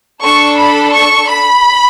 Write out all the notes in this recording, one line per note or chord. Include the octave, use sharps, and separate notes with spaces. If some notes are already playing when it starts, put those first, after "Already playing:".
D4 A4 C#6
B5
C#6
B5